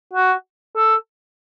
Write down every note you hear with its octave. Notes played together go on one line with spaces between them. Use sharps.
F#4
A4